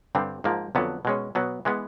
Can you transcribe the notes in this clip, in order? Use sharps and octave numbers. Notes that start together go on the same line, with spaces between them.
G2 D3 G3 C4
G#2 F3 A#3
F2 D3 F#3 B3
B2 G#3 C#4
B2 F#3 B3
E3 G#3 B3